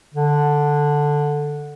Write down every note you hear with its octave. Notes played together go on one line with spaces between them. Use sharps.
D3